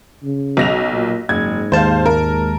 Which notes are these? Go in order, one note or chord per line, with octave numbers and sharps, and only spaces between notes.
C#3
B1 A#6 F7
A#2
F#1 G#2 G#6
D#2 G#3 C5 F5 A5
A#4